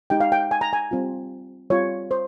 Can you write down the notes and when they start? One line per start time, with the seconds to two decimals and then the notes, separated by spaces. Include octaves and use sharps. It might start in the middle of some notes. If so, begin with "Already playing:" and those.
0.10 G#3 D#4 G4 G5
0.20 F5
0.32 G5
0.51 G#5
0.61 A#5
0.73 G#5
0.91 G3 C4 F4
1.70 G3 C4 F4 C#5
2.11 C5